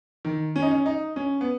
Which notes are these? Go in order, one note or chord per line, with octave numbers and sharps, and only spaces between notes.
D#3
C#4
D#4
C#4
D#4
C#4
B3